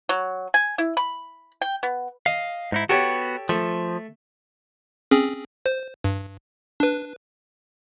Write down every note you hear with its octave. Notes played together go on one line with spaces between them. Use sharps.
F#3
G#5
E4
B5
G5
B3
D#5 F5
G#2 D#4 E4
B3 F#4 G4 A4 C#5
F3 A3
C4 C#4 G#4
C5
G2
D4 B4